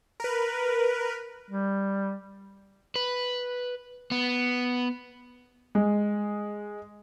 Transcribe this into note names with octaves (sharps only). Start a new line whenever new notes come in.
A#4 B4
G3
B4
B3
G#3